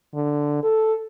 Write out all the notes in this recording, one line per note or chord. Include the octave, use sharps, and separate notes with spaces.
D3
A4